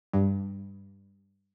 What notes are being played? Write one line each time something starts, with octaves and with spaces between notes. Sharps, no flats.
G2